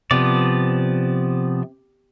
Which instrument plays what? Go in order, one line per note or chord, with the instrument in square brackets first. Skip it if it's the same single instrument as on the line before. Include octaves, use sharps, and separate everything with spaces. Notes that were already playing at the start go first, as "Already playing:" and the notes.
[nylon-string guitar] C3 [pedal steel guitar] F3 B3 D5